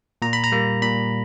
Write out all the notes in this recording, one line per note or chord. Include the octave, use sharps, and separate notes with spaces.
A#2 A#5
B5
A#5
G3 A#3
A#2 B5